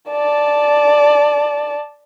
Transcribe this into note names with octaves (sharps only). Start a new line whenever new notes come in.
D5 A5